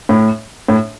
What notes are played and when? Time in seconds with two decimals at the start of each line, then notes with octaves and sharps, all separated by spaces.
0.09 A2
0.68 A2